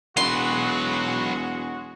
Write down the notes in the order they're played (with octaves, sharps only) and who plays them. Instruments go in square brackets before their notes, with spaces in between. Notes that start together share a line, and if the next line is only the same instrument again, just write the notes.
[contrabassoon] E1 [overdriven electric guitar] F#3 B4 [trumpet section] G#3 F#4 [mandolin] C6